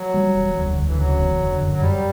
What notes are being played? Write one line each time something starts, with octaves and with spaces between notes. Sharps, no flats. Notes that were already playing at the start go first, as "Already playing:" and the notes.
Already playing: F#3
G3
E1
D2
D2
E3
C#3 F#3
E1
D3
F#2
F#3
F#2 G3